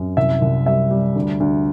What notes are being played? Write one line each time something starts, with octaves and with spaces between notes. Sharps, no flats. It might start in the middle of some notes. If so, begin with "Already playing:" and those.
Already playing: F#2
C2 E5
C2
G3 E5
G3
D2
D2